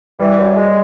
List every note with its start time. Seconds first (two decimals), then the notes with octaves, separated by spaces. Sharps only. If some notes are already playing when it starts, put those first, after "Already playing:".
0.20 E3 G3
0.38 F#2
0.56 G#3